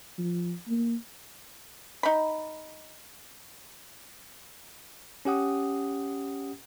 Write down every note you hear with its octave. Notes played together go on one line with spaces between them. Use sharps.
F3
A#3
D#4 B5
C#4 G4 F#5 D#6